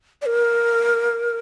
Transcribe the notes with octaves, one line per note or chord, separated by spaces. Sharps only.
D5
A#4